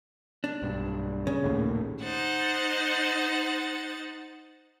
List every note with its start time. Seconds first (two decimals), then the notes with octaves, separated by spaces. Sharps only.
0.44 D4
0.62 B1 G2
1.27 C#3
1.43 A#1 D#2 A2
2.03 D#4 C5 F#5 A6